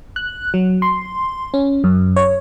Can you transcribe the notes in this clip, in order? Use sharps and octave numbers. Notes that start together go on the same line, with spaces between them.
F#6
F#3
C6
C#4
F#2
C#5